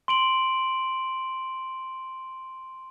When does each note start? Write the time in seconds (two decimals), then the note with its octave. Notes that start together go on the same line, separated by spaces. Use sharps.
0.08 C6 D7 F#7